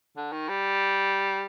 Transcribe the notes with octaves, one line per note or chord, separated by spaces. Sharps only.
D3
D#3
G3